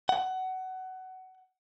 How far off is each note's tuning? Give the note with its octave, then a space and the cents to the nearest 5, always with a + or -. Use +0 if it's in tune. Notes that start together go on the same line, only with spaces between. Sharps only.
F#5 +20